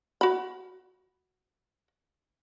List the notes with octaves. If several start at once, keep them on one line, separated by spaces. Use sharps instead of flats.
F#4 B5